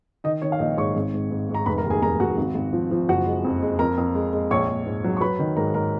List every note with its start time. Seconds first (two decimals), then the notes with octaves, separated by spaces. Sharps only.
0.24 D#3 D#4 D#5
0.42 D#3 C#5
0.52 F5
0.59 A#1 D#4 D#5
0.77 G#2 C#5 C#6
0.96 G#1
1.14 G#2
1.31 G#2
1.49 G#2
1.54 A#5
1.66 F1 B4 B5
1.78 A#4 A#5
1.84 D#2
1.90 G#4 G#5
2.02 F1 A#4 A#5
2.20 F1 F#4 F#5
2.37 G#1
2.55 G#1
2.73 F3
2.91 F3
3.09 F#1 F#4 F#5
3.27 G#3
3.44 F2
3.62 G#3
3.79 F2 A#4 A#5
3.97 F2
4.15 G#3
4.33 G#3
4.51 A#1 C#5 C#6
4.69 A#1
4.85 G#2
5.04 F#3
5.17 C#6
5.21 F#3 B4 B5
5.39 D#3
5.56 G#2 A#4 A#5
5.74 G#2 A#4 A#5